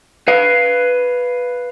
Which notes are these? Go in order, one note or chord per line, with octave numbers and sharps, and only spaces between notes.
B4 F5